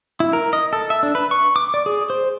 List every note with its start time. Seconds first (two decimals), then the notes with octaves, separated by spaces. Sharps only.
0.20 E4
0.33 A#4
0.53 D#5
0.73 A4
0.90 E5
1.03 D4
1.15 B4
1.31 C#6
1.56 D6
1.74 D5
1.86 G#4
2.10 C5